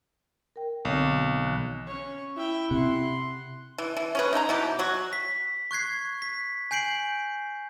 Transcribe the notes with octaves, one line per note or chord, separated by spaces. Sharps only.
A#4 G5
B1 D3 C4
D#3 E3 F#6
C#4 C#5
E4 E5 G5
C3 F#5 C6
E3
E3
C#4 G#4 B4
D#4 E5 G5 A#5
B2 E3 G4
F#3 F#4
B6
C#6 F#6 G#6 C7
B6
G#5 G6 C7 D7 F#7